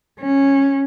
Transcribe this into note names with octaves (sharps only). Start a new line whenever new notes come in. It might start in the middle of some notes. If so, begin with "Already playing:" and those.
C#4